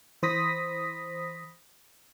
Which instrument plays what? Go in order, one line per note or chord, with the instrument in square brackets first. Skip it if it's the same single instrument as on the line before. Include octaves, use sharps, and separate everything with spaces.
[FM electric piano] E3 C5 B5 D#6 A#6 B6